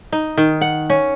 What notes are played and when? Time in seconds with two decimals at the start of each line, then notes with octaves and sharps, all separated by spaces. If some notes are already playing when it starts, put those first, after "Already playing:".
0.12 D#4
0.38 D#3
0.61 F#5
0.90 C#4